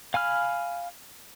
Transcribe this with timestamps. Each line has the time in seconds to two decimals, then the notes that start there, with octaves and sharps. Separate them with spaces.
0.14 F5 G#5 B5 F6